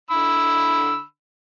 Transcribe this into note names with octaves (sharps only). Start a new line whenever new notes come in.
D3 B5 E6